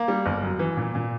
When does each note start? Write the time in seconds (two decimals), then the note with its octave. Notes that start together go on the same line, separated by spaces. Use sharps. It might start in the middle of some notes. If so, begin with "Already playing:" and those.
Already playing: A#3
0.08 G3
0.26 G1
0.42 F#2
0.59 E3
0.77 A#2
0.95 A#2